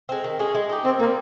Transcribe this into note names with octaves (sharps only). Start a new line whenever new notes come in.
G#3 C4
D#3
G#3 C#4 G#4
G#3
D#4 G4
D#3 C4
G3 A#3 C4